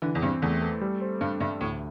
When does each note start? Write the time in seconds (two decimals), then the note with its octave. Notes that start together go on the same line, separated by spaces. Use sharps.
0.02 D3 E3
0.15 E2
0.22 G2 C4
0.42 E2 A3
0.62 A4
0.81 G3
1.01 C5
1.21 G2 D4
1.40 G2 E5
1.61 D2 A2